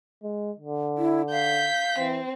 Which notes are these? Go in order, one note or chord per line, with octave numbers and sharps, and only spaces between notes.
G#3
D3
E4
F5 G6 B6
E3 C4